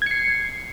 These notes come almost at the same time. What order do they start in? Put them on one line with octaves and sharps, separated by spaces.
G#6 C#7 C7